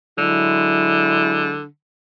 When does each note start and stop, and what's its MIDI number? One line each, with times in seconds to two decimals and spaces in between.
0.18 1.66 50
0.18 1.61 54
0.18 1.61 56
0.18 1.61 64